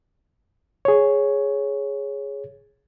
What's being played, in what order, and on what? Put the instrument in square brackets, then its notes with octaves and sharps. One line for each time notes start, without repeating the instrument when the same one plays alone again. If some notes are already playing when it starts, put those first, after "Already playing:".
[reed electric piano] G#4 C#5